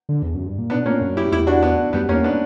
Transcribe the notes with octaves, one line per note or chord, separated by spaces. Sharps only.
D3
E2
F#2
G2
A#2
B2 B3 D4
A#2 A#3 C#4
F#2
E4 G4
E2 E4 G4
D4 F#4
B3 D4
F#2 G3 B3
E2 A#3 C#4
B3 D4